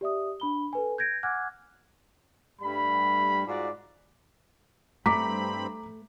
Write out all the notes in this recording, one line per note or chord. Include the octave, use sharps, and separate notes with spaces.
G4 D5 E5 D#6
D4 B5 G7
A4 B4 G#5
G6 G#6 A#6 D7
F#5 G#5 D6 F6 F#6 G#6
G2 G3 A3 B5
G#2 F4 F#4 D5
G2 A3 C4 A#5 B5 D6 B6